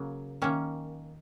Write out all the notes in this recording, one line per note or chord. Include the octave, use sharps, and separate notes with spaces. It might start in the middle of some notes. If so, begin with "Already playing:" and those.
Already playing: C#3 F#3 A#3
D#3 A#3 C#4